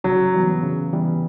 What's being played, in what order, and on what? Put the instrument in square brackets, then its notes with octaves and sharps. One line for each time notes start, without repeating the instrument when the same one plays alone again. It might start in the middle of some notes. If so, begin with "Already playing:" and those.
[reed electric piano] C#3 [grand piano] F#3
[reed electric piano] E3 G3 B3
C#3
E3 G3 B3